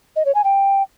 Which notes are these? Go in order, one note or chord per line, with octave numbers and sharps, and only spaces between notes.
D#5
C#5
G#5
G5